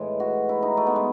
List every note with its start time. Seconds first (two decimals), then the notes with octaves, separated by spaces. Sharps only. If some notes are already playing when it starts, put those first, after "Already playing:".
Already playing: A2 E3 G#3
0.20 F#4
0.49 E4
0.62 D#4
0.77 A3
0.87 B3
0.96 G#3